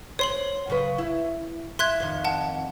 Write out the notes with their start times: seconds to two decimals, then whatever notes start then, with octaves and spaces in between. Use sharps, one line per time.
0.19 C5 C#5 C6 F#7
0.67 F#2 C#3 B4
0.98 E4
1.79 E5 C6 F#6 G#6
2.00 F2 D#3
2.25 F#5 A5